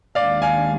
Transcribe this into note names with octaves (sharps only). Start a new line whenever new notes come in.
D#2 D#3 G#3 D4 D5 F5
F5 G#5